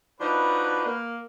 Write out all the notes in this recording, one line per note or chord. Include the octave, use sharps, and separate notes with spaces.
F3 D4 D#4 F#4 B4
A#3